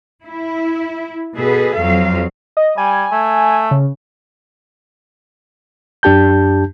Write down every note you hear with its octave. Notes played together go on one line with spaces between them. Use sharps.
E4
B2 G#4 A4 B4
F2 F#3 F5
D#5
G3 G#5
A3
C#3
F#2 D4 G4 A5 G6